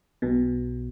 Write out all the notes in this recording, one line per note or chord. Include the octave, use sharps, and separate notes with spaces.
B1 B2